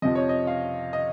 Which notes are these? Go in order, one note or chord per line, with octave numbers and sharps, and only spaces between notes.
F2 C3 F3 D#5
C#5
D#5
F5
D#5